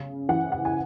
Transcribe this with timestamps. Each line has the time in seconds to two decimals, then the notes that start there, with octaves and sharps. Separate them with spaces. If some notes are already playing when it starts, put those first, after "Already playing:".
Already playing: C#3
0.29 E3 F#5
0.52 F#5
0.65 G#5